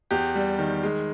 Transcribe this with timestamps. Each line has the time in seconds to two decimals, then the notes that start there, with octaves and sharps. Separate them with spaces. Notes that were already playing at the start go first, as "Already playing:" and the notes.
0.11 E2 G4
0.35 G3
0.59 D#3
0.83 G#3